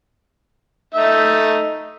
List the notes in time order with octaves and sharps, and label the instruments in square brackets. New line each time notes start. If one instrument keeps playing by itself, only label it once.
[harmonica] A3 D#4 E5